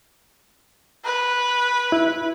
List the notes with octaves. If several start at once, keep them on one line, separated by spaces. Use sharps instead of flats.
B4
E4